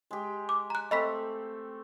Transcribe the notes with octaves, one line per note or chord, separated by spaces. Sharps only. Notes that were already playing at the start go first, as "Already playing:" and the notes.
G#3 G4
D6
A#5 F#6
A3 C4 D#5 B5 B6